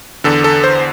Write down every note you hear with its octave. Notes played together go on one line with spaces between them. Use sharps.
E2 D3 A4
A4
C5